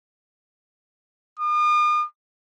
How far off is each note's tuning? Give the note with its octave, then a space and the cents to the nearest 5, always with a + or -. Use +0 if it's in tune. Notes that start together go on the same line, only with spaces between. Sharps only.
D#6 -45